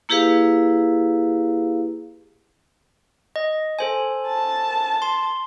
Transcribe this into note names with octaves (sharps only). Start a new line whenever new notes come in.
A#3 E4 G4 G#4 B4 F5
D#5
A4 C5 G#5
A5
C6